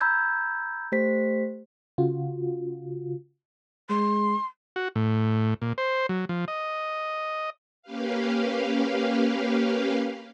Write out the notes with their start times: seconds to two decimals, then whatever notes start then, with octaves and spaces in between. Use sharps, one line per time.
0.01 A#5 B5 E6 G6 G#6
0.92 A3 G4 C5 B6
1.98 C#3 F4 F#4
3.90 G#3 C6
4.76 F#4
4.96 A2
5.62 A#2
5.78 C5
6.09 F#3
6.29 F3
6.48 D#5
7.82 A#3 C#4 G4 B4 F5